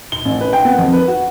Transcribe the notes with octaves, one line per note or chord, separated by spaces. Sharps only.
G7
A1
B4
G5
B3
F2
B4
F#4